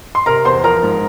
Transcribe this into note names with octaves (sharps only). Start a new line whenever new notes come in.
C6
C3 A#4 A#5
E2 C5 C6
F3 A#4 A#5
G#2